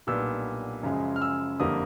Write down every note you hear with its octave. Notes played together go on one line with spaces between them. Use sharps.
B1 A#2 G3 B3 D4 E6
F#2 C#3 F3 G#3
F6
E6
F#1 F2 D3 G3 A#3 D#6